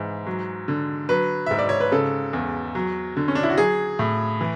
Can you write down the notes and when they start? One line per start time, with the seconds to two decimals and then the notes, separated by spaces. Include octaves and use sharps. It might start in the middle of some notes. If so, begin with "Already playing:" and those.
Already playing: G#2 E3
0.26 F#3
0.68 D3
1.09 F#3 B4
1.46 G#2 E5
1.58 D5
1.69 C#5
1.80 B4
1.92 C#3 A4
2.33 E2
2.75 F#3
3.17 D3
3.28 C#4
3.35 D4
3.43 E4
3.50 F#4
3.58 F#3 G#4
3.99 A2
4.41 E3